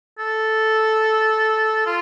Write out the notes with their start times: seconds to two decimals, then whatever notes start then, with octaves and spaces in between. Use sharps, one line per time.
0.19 A4
1.86 F4